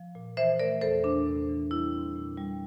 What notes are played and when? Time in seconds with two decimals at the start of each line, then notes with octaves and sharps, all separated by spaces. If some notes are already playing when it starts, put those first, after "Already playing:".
Already playing: F3
0.15 A#2
0.37 E3 C5 E5
0.59 A3 A#4 D5
0.81 E2 A4 C5
1.04 E2 D4
1.27 C3
1.49 E3
1.71 G3 E4
1.93 C4
2.16 A#2
2.38 G3